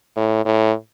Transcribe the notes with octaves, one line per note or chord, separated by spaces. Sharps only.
A2
A2